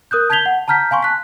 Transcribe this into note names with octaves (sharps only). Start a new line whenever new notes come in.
A#4 D#6 F#6 G6
A5 G6 G#6 B6 F7 G7
F#5
A5 A#5 F6 G6 B6
F5 G#5 C6 C#6
A5 F#6 B6